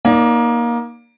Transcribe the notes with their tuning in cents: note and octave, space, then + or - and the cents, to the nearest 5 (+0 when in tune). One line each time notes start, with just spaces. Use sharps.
A#3 +20 D#4 +0 D5 -25